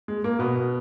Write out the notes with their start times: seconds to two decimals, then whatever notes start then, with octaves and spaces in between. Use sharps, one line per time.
0.08 G#3
0.24 A#3
0.39 B2 B3